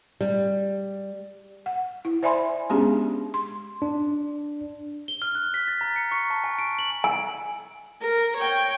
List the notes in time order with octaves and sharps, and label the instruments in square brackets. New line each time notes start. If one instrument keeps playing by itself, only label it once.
[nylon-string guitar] G3
[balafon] F#5
E4
C5 D5 E5 G#5 B5 C6
G#3 B3 C#4 D4 G4 G#4
C6
[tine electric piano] D4
[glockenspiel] G7
F6
F#6
B6
A6
A#5
C#7
C#6
A5
G#5
D7
F#7
[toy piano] G#5
[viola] A#4
C#5 G5